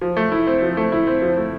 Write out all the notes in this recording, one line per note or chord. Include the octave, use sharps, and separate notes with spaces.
F3
A3
E4
C4
F3
A3
E4
C4
F3
A3